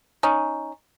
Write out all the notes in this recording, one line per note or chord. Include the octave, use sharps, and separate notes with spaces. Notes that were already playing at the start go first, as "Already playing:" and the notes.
C#4 D#4